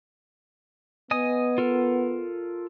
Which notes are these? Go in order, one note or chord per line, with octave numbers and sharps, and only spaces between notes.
B3 D#5 G#5 D#6
F4 A4 A#4